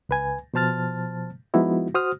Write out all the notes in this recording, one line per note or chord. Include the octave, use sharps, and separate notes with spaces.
C#2 B4 G#5
B2 F3 C5 A5 F6 A6
F3 G#3 B3 D#4 E4 F#4
F#4 C5 D#6 F6